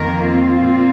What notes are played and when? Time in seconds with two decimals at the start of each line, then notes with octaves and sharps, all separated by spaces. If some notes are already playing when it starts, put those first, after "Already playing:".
Already playing: F2 D#3 A#3 A#4
0.24 C4 F4
0.58 A#2 A#3